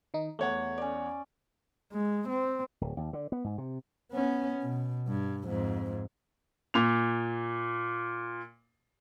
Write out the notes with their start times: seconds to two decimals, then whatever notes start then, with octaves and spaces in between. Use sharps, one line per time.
0.14 D#3 D#4
0.39 E2 A3 C#5 F#5
0.78 C#4 D5
1.92 G#3
2.28 C4
2.81 D1
2.97 D#2
3.13 D3
3.32 B3
3.44 G#2
3.58 C3
4.12 B3 C#4
4.62 B2
5.08 G2
5.46 F2 G#2
6.74 A#2 F7